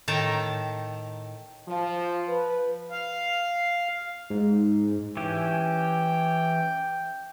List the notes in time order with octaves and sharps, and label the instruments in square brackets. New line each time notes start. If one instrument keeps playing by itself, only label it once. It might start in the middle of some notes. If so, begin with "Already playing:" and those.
[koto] A2 D#3 G5 A5 A#5
[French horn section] F3
B4
[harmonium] F5
[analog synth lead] G#2
[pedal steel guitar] E3 C#4 G4 [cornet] G5